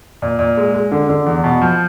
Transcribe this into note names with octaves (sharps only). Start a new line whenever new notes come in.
A#2
A#2
G#3
G#3
D3
D3
E2
B2
F3